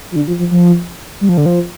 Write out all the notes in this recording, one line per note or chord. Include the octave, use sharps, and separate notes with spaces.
F3
D3
F3
F3
F3
G3
F3
D3
F3